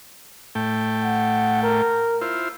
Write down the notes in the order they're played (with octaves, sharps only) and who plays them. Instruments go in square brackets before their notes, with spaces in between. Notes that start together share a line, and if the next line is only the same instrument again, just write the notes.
[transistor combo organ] A2 A3 G5
[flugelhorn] F#5
A#4
[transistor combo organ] E4 F4 C5